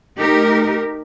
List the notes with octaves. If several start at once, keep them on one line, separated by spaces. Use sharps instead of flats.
A3 D#4 G4 A#4